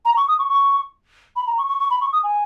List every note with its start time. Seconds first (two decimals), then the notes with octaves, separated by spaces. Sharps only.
0.05 A#5
0.17 C#6
0.28 D#6
0.39 C#6
0.49 C#6
1.36 B5
1.47 A#5
1.58 C#6
1.69 C#6
1.80 C#6
1.90 B5
2.01 C#6
2.13 D#6
2.23 G#5